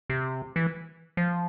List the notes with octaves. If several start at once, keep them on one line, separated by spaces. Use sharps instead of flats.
C3
E3
F3